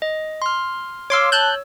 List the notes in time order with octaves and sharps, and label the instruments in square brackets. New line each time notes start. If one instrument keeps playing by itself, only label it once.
[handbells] D#5
C6 F6
[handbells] C#5 E6 [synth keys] F5 C6 D6
[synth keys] A5 F#6 G6